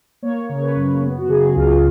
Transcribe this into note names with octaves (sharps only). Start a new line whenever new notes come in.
A#3 C#5
C#3
C#5
B4
F#2
B3
F#4
C#3 G#4
C#2 F4